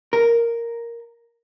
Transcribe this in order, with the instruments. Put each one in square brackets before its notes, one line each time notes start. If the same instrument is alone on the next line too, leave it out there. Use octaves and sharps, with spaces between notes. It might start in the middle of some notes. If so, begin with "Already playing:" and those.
[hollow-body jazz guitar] A#4